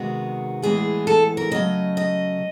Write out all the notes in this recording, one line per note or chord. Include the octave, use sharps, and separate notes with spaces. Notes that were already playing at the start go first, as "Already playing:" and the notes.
Already playing: C3 D#3 G#3 B3 F#4
A2 E3 G#3 B3 G#4
A4
A#4
C#3 F#3 A3 D#5
D#5